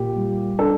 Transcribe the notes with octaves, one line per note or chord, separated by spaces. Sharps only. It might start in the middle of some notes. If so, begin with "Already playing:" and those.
Already playing: A#2 G4
G3
D4 A4